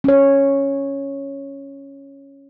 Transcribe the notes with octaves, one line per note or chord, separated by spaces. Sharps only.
C#4 C#5